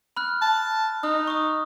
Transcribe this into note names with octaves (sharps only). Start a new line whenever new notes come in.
B5 F6 F#6
A5
D#4 D#6
C#6 D#6